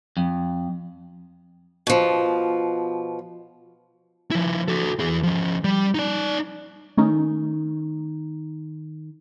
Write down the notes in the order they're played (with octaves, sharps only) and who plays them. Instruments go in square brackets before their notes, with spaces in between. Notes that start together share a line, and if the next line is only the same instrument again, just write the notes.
[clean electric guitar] F2
[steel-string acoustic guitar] B2 F3
[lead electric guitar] F3 E4
F#4 A4
E2 G#4
F3 C#4
G3
D#4 D5
[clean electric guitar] D#3 [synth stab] A3 C#4 D#4